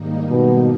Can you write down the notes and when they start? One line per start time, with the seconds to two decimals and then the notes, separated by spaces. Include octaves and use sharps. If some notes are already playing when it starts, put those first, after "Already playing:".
Already playing: G#2 D#3 G3 A#3 D#4
0.30 B2